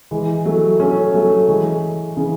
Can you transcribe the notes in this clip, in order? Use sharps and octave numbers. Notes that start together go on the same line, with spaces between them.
E3 G#3
F#3 A3
A3 C#4
F#3 A3
E3 G#3
C#3 E3